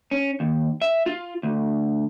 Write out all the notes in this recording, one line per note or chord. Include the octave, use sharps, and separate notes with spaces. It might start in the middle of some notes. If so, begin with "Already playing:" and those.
C#4
D#2
E5
F4
D2